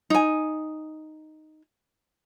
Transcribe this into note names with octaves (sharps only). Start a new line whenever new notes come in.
D#4 G#5